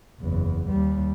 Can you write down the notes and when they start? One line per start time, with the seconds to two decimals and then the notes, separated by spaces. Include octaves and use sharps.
0.21 F#1 E2
0.69 D#2 G3